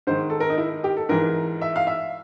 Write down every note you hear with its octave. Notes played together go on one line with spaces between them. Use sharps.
G#2 D#3 C5
A4
A#4
D#4
E4
G4
A4
G#2 E3 A#4
E5
F5
E5